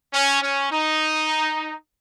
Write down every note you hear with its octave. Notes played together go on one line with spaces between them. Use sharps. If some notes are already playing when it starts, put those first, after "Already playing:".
C#4
C#4
D#4